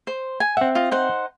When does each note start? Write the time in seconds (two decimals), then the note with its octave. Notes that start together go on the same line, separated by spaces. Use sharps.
0.07 C5
0.40 G#5
0.57 C4 E5 F#5
0.75 F4 D#5
0.91 D#4 C5 F#5